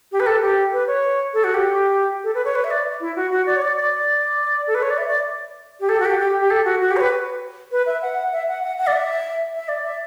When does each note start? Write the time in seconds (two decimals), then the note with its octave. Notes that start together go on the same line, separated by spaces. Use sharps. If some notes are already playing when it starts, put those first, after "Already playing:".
0.12 G4
0.20 B4
0.26 A4
0.42 G4
0.73 B4
0.87 C#5
1.34 A4
1.44 F#4
1.54 G4
2.24 A4
2.35 B4
2.45 C#5
2.55 B4
2.64 E5
2.71 D5
3.01 E4
3.16 F#4
3.31 F#4
3.46 D5
3.56 C#5
3.62 D5
3.76 D5
4.67 A4
4.75 B4
4.83 C#5
4.90 D5
4.98 E5
5.08 D5
5.80 G4
5.89 A4
6.00 F#4
6.05 G4
6.19 G4
6.40 G4
6.51 A4
6.65 F#4
6.81 F#4
6.91 G4
6.97 C#5
7.01 B4
7.72 B4
7.86 E5
8.02 F#5
8.33 E5
8.48 F#5
8.63 F#5
8.77 F#5
8.87 D5
8.93 E5
9.54 E5
9.68 D5
9.84 E5